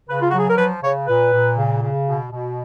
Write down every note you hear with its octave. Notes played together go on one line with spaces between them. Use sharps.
C#3 B4
F4
F#3 F#4
G#4
A#4
F3 B4
C#3 C#5
A#2 B4
A#2
C#3
C#3
B2
B2